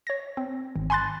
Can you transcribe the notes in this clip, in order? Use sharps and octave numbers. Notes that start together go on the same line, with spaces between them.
C#5 A#6
C4
G#1
G#5 B5 C6 F#6 A6